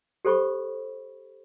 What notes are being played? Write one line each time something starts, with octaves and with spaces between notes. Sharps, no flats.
G4 A4 C5 B5 C#6